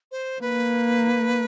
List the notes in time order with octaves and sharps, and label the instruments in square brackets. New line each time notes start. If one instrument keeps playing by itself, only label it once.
[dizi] C5
[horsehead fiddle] A#3 [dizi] B4